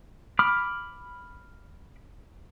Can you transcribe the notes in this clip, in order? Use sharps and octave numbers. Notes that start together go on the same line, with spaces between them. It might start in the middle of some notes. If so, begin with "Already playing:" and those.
B5 D6 F6